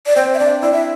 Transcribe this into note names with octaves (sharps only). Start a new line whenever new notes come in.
D5
C4 C5
E5
D4 D5
E4 D5
E5